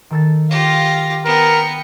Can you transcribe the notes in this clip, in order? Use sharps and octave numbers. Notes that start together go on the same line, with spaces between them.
D#3 A4 A6
F4 G4 F5 A#6
B3 A#4 G5 C#7